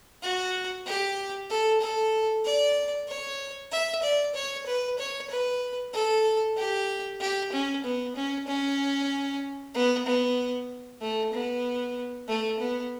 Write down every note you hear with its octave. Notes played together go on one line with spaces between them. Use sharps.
F#4
G4
A4
A4
D5
C#5
E5
D5
C#5
B4
C#5
B4
A4
G4
G4
C#4
B3
C#4
C#4
B3
B3
A3
B3
A3
B3